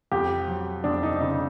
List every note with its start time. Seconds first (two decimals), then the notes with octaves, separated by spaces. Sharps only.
0.12 F2 G4
0.48 F#3
0.84 F2 D4
1.03 D#4
1.21 C#3 D#4